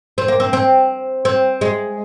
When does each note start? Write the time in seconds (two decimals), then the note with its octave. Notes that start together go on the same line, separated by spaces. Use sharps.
0.18 C4
0.28 A#3
0.40 C4
0.53 C4
1.25 C4
1.61 G#3